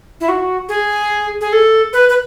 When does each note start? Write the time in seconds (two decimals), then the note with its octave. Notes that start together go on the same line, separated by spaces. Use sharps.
0.21 E4
0.28 F#4
0.69 G#4
1.41 G#4
1.53 A4
1.93 B4
2.09 B4